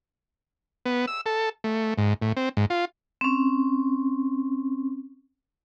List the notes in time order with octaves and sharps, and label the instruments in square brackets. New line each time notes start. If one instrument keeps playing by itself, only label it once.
[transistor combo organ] B3
E6
A4
A3
G#2
A2
C4
G#2
F4
[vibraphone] C4 C#4